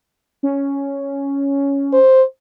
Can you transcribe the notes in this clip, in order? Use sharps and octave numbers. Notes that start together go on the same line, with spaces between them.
C#4
C5